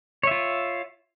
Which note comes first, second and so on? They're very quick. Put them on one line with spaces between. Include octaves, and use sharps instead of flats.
C#5 E5 F4